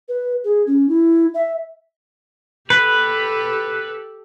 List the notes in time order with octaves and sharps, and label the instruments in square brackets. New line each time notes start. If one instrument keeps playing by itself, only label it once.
[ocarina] B4
G#4
C#4
E4
E5
[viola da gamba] G4 A4 [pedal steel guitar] B4